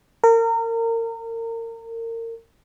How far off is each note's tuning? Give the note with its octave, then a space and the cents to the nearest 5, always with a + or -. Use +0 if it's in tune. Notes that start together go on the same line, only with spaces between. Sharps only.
A#4 -30